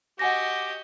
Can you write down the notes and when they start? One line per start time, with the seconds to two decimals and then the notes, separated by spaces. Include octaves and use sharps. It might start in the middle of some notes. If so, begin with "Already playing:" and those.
0.19 F#4 G4 D#5 F#5 G#5 A#6